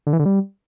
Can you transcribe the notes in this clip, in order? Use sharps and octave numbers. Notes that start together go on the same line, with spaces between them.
D3
E3
D3
G3